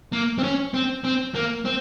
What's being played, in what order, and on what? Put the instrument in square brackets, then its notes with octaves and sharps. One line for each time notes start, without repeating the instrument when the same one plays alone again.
[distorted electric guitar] A#3
C4
C#4
C4
C4
A#3
C4